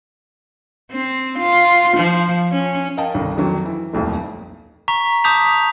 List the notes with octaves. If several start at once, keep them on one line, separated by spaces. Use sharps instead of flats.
C4
F4
F3
C#4
A#4 D#5 F5 G5 A5
G1 C2 D#3
F2 D#3 F#3
E3
D#1 B1 F2 A2
A#5 C#6 B6
A5 D6 D#6 G6 B6 F7